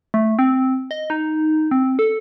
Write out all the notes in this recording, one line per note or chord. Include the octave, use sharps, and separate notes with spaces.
A3
C4
D#5
D#4
C4
A4